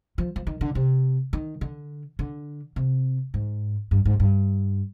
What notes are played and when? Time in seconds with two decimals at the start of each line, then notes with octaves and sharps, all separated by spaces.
0.18 F3
0.36 F3
0.47 D#3
0.61 D3
0.75 C3
1.33 D#3
1.61 D3
2.19 D3
2.76 C3
3.34 G#2
3.91 G2
4.05 G#2
4.20 G2